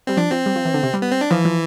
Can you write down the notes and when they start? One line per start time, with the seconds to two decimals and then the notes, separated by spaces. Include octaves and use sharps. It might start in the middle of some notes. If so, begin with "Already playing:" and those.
0.07 G3 C4
0.17 F3 D4
0.31 F3 C4
0.46 G3
0.56 F3
0.65 E3
0.74 D3
0.83 C3
0.94 G3
1.02 B3
1.12 C4
1.21 D4
1.31 E3 F3
1.45 F3